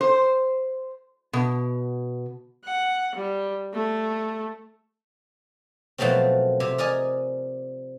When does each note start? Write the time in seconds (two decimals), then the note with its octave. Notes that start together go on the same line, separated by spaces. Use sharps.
0.01 C5
1.33 B2
2.64 F#5
3.15 G3
3.73 A3
5.98 B2 F3 F#3 A3 A#3 C4
6.60 C3
6.78 A#4 D5 D#5 G#5